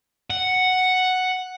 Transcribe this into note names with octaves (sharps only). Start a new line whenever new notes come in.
F#5